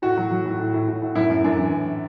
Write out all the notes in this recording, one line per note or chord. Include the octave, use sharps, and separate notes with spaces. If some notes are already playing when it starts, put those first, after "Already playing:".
A2 F#4
F#3
F#3
A2
A2
A2
A2
A2
F#2 E4
F#2
F#2 D4
E3
F#2